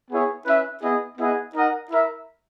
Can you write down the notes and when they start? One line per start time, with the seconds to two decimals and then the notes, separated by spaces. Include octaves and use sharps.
0.10 B3 E4 G#4 C#5
0.46 C#4 E4 B4 E5
0.82 B3 E4 G#4 D#5
1.18 B3 E4 G#4 D#5 F#5
1.54 D#4 A#4 D#5 F#5
1.91 E4 A#4 E5